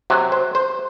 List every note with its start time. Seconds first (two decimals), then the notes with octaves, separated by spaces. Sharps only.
0.10 C3 F#3 F#4
0.32 C5
0.55 C5